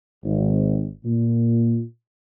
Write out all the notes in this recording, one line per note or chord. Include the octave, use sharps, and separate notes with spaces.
G#1
A#2